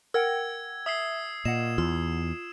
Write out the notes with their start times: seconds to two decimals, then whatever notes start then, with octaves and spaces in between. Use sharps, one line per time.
0.14 A#4 F#5 G5 E6 G#6
0.86 E5 D#6 E6 C7
1.45 A#2 D#5 F#5 E7
1.78 E2 F4 E6